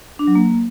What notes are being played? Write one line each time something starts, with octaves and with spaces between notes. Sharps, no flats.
D4
F#3
A#3